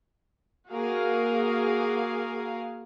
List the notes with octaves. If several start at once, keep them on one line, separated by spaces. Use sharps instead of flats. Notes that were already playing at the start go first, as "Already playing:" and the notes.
A#3 F#4 G#4 A#4 F5